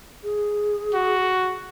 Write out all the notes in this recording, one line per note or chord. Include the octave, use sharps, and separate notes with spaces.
G#4
F#4